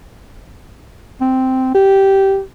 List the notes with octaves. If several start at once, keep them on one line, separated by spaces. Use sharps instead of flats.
C4
G4